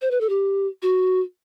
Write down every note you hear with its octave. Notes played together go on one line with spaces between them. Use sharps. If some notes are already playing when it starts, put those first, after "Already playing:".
C5
B4
A4
G4
F#4